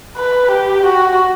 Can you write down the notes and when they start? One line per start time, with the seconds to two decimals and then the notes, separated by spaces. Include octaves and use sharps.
0.17 B4
0.51 G4
0.86 F#4